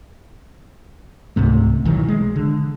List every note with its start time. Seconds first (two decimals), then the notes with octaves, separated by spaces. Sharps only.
1.36 C#2 G#2 C3 A3
1.85 B1 D#3 E3 F#3
2.08 G#3
2.36 D3